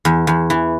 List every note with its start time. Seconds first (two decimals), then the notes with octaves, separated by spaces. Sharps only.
0.05 E2
0.27 E2
0.50 E3